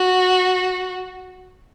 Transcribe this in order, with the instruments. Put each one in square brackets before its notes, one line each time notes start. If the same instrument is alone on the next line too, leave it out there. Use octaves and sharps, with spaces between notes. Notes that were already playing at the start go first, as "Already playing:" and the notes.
Already playing: [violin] F#4